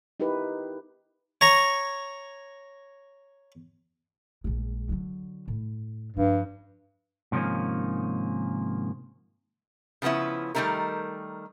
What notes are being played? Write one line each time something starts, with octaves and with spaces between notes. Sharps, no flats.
D#4 E4 G4 A#4 B4
C#5 A#5 C#6
A#1 G#3
D3 F#3
A2
G2 F3
G#2 C3 D#3 F3 A#3 C#4
C#3 F3 B3 C#4 E4
D#3 E3 G3 A3 D#4 A#4